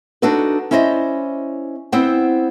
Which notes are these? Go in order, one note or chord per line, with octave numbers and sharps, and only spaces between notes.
D4 D#4 F#4 A4 B4
C#4 E4 C5 D5 D#5
B3 C4 E4 C5 F#5 G5